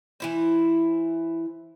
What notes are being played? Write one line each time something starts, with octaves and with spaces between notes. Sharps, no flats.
E3 E4 C5